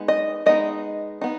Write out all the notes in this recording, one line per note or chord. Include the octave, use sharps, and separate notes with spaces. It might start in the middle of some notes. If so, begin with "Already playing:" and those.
Already playing: G#3 B3 D#4
D#5
G#3 B3 D#4 D#5
B3 D#4